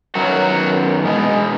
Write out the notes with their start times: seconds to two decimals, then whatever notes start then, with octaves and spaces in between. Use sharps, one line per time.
0.15 F#2 D#3 F#3 B3 F#4
1.05 B2 G#3 B3